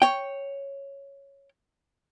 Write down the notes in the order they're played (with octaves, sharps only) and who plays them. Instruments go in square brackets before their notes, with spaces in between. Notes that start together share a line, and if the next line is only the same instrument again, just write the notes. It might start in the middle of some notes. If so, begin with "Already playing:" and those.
[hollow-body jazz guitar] C#5 G5